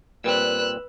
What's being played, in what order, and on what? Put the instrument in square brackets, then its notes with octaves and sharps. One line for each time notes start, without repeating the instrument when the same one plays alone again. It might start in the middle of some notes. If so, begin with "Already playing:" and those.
[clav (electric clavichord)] A#2 G3 C4 [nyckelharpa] B4 [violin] E6 F#6